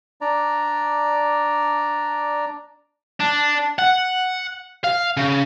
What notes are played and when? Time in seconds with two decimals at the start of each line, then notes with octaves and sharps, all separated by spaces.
0.21 D4 D5 A#5
3.20 D4
3.79 F#5
4.84 F5
5.17 C#3